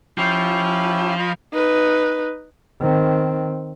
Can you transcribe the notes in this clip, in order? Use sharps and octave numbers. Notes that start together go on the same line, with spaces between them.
F3 C#4 E4 G4
D#5 B5
D#4 B4
D#3 C4